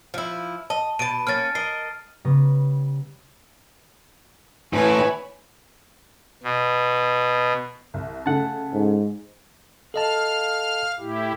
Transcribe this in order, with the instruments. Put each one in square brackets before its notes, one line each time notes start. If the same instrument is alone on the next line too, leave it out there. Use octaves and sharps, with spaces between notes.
[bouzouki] F3 E4
[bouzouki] D#5 [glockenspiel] A5
[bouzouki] B2 A5 [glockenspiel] D7 D#7
[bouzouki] A#3 C#4 [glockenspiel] F6 A6
[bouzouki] A#4 D#5 [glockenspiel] C7 D#7
[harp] C#3 G3 B3 A#5 C#6 A#6
[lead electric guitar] A2 E3 [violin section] E4 C#5 G#5 [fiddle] B4
[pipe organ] B2
[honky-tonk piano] C2
[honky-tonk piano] C#3 A3 [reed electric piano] F#5 A5
[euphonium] G#2
[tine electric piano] A4 D#5 A5 [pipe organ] F5 F6
[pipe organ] A2 E4 G4